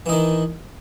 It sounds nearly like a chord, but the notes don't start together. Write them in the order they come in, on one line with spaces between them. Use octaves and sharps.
E3 D#4 D#3